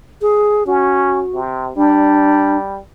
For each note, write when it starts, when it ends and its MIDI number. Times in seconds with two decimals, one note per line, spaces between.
0.22 0.66 68
0.67 1.22 61
0.67 1.39 66
1.34 1.72 48
1.76 2.80 55
1.76 2.57 62